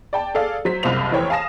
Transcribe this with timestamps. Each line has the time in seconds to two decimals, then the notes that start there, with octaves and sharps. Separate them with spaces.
0.13 D5 G5 A5
0.35 G#4 A4 D5 F5
0.65 F#3 C5 B6
0.83 F#1 C2 C3 F4 C5 F7
1.11 F1 E3 C5 C#5 G5
1.30 F5 G#5 A5 D#6 A#6 E7